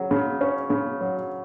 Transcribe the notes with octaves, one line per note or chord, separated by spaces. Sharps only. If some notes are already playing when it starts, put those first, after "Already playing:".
Already playing: C#3 F#3
C#3
C#4
C#3
F#3